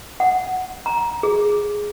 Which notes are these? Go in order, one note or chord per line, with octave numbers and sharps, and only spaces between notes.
F#5
A#5
G#4